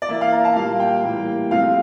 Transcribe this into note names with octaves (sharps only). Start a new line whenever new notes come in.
D5
E3 A#3 E5
F5
A#5
A5
A#2 G3 A#3 F5
G5
A2 E3 G3 A#3
C3 F3 A3 C4 F5